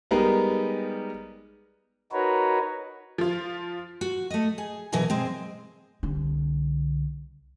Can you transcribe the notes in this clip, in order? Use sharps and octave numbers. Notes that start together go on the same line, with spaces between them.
G3 G#3 B3 D#4 A#4
D#4 F#4 A#4 B4 C#5
F3 F4
F#4
A3 D#5
G#4
B2 E3 F#3 G#4 A#4
G#3 C4
C2 D3